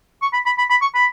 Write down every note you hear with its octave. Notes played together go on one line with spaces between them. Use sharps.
C#6
B5
B5
B5
B5
C#6
B5